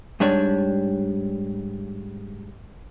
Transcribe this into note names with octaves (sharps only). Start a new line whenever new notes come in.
G#2 G3 D4 C#5